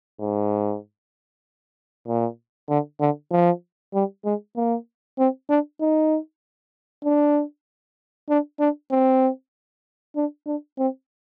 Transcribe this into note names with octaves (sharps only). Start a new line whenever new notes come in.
G#2
A#2
D3
D3
F3
G3
G#3
A#3
C4
D4
D#4
D4
D4
D4
C4
D4
D4
C4